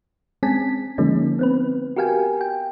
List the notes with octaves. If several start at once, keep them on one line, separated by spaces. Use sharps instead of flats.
G#3 C4 C#4 G#5 A5 B6
D3 F3 G#3 A#3 C#4 D#4
B3 C4 B4
F#4 G4 A#4 F5 G5 G#5
G5